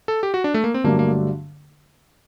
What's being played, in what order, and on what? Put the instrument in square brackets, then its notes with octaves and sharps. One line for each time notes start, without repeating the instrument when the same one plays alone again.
[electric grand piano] A4
G4
F#4
D4
A3
A#3
C4
[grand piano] G2 D3 F#3 A3 D4 [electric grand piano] A#3
[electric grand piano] A#3